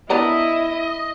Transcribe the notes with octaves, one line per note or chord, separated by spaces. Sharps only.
B3 D4 E4 A#4 D#5